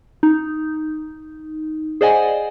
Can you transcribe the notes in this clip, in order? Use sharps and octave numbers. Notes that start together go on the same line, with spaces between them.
D#4
G#4 C5 D5 D#5 F#5 G#5